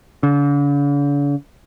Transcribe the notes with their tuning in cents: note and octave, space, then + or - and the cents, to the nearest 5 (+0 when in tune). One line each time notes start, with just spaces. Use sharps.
D3 -45